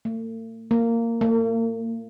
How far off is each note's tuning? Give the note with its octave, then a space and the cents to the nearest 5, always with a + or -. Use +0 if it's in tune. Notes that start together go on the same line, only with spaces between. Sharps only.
A3 +45
A#3 -15
A#3 -40